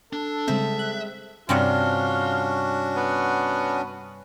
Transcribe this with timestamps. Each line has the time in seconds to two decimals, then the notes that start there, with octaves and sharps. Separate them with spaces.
0.13 D4 A4
0.48 C#3 G3 G#3 C4 C5 E5
0.79 F#6
1.49 G2 C3 C#4 D4 F4 F#4 F#5
2.96 B3